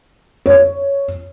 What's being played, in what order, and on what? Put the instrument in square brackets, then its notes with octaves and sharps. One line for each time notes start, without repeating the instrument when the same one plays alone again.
[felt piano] C#5